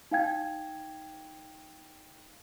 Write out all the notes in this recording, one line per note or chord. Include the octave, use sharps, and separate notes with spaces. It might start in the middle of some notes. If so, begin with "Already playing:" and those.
D#4 F5 G5 G#6